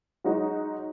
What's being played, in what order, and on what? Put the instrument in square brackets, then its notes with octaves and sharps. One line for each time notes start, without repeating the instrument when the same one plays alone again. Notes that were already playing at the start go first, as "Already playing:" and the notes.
[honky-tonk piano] F#3 G#3 D#4 F#4